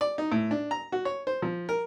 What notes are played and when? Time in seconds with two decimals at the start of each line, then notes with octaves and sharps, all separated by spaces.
0.01 D5
0.18 D#4
0.32 A2
0.51 D4
0.71 A#5
0.92 F#4
1.05 C#5
1.27 C5
1.42 F3
1.69 A#4